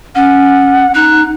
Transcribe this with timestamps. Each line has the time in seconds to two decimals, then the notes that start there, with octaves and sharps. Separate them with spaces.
0.15 C#4 F#5
0.95 D#4 F#6